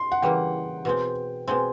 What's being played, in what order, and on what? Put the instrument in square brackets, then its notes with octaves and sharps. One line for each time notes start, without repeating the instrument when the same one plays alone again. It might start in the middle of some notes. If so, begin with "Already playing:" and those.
Already playing: [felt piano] C6
F#5
[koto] C#3 E3 G3 A#3 [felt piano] G5
[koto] B2 G#3 C4
[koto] B2 G#3 C4 [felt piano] G#5